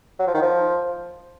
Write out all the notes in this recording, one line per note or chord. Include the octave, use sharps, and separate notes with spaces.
F#3
F3
D#3
F3